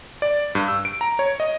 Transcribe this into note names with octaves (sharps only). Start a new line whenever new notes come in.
D5
G2
E6
D7
A#5
C#5
D#5